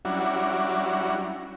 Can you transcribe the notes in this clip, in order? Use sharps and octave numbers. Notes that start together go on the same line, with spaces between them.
F#3 G3 C#4 D4 E4 F#4